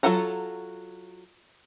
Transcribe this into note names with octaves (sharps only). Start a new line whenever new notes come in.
F#3 F4 A4 F#5 A#5